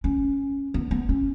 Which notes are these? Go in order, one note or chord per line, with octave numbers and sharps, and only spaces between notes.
C#4
B3
B3
C#4